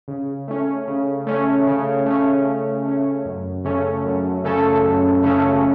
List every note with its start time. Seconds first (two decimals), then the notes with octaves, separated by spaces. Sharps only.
0.08 C#3
0.48 A3 C#4
0.88 C#3
1.27 A3 C#4
1.67 C#3
2.06 A3 C#4
2.45 C#3
2.85 A3 C#4
3.25 F#2
3.64 C#3 A3 C#4 A4
4.05 F#2
4.44 C#3 A3 C#4 A4
4.84 F#2
5.23 C#3 A3 C#4 A4